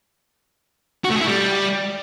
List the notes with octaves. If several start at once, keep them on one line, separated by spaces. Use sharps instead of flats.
F#4
A3
G#4
E4
G3